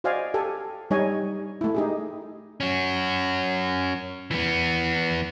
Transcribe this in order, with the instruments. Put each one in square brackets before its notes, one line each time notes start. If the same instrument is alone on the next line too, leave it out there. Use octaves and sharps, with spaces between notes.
[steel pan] F#4 C5 D5 D#5 F5 G#5
G4 A4 G#5
G3 D#4 C#5 D#5 G#5
A3 E4
D#4 G4 G#4
[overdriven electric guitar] C#4 F#4
E3 B3